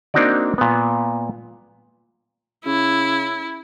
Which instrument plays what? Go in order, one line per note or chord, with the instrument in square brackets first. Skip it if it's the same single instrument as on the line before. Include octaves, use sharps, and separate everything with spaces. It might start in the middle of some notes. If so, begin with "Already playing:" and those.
[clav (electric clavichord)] A#3 C4 D4 D#4 F#4 D5
A#2 B3
[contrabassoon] C#3 [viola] E4